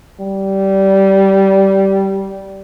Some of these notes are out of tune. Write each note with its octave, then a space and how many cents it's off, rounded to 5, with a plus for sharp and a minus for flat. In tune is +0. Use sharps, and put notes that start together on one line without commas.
G3 -15